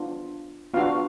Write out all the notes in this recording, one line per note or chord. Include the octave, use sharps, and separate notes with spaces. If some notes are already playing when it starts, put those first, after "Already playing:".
Already playing: B3 D4 F4
B3 D4 F4 F#4 F5